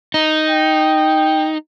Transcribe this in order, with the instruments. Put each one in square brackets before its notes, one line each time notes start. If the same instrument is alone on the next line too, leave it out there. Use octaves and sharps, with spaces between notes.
[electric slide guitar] D#4
[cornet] G5